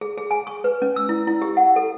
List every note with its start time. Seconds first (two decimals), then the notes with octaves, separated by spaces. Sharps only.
0.01 G#4
0.18 G#4
0.31 G#5
0.47 C#6
0.64 B4
0.82 C#4
0.96 E6
1.09 E4
1.27 E4
1.42 G4
1.57 F#5
1.76 A4